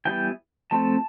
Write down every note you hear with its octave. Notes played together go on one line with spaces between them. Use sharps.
E3 G3 B3 G5
F3 A3 C4 A5